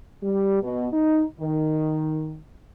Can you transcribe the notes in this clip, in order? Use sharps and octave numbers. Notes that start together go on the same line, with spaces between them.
G3
B2
D#4
D#3